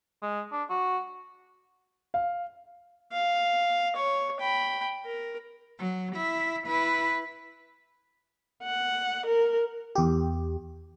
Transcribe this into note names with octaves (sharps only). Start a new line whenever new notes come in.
G#3
D4
F#4
F5
F5
C#5
G5 B5
A#4
F#3
E4 E5
E4 B4
F#5
A#4
E2 G4